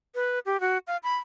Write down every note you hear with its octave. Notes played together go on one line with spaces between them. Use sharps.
B4
G4
F#4
F5
B5